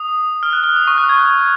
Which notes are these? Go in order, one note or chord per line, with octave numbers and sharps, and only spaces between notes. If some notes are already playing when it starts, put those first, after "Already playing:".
Already playing: D#6
F6
F#6
F6
D#6
C#6
F#6
G#6